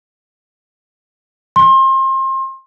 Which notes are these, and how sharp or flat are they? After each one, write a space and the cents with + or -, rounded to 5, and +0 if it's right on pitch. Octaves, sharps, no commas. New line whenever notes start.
C6 +30